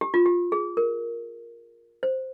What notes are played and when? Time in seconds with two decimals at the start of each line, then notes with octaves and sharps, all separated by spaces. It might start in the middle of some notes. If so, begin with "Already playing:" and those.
0.01 G4
0.14 F4
0.26 G4
0.52 G#4
0.77 A#4
2.03 C5